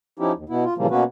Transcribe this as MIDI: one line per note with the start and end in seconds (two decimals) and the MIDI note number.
0.19 0.32 53
0.19 0.32 61
0.19 0.32 63
0.19 0.32 64
0.19 0.32 67
0.36 0.44 39
0.49 0.64 47
0.49 0.64 59
0.49 0.64 64
0.64 0.74 65
0.78 0.87 46
0.78 0.87 49
0.78 0.87 52
0.78 0.87 53
0.78 0.87 55
0.78 0.87 58
0.91 1.04 47
0.91 1.04 58
0.91 1.04 59
0.91 1.04 61
0.91 1.04 66
0.91 1.04 71